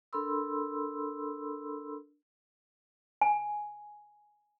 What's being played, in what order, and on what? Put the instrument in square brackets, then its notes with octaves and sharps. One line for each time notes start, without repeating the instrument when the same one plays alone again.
[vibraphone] D4 A4 A#4 B5 C6 E6
[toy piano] G#5